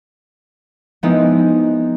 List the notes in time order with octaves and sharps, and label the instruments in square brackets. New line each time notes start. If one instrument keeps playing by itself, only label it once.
[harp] F3 G#3 B3 C4 D#4 E4